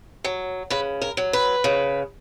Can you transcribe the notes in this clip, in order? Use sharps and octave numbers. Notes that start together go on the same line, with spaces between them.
F#3
C#3 B4
A#4
F#3
B4
C#3